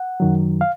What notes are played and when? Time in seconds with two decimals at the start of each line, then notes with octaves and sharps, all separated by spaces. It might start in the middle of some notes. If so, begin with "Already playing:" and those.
Already playing: F#5
0.20 F#2 D#3 F#3
0.61 F5